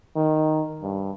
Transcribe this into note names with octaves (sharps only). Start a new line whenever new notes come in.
D#3
G2